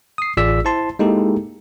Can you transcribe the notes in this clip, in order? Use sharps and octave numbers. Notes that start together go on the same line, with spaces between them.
D#6 C7
A1 F4 G#4 D5 E6 B6
E4 C5 A5 C6
G#3 A#3 D#4 E4 G4 A4